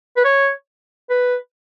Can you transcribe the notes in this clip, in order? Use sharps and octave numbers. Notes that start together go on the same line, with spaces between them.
B4
C#5
B4